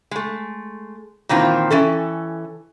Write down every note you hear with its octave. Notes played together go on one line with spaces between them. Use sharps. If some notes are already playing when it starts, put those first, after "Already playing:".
G#3 A3
A#2 D#3 E3 C4 F4
E3 C#4 A4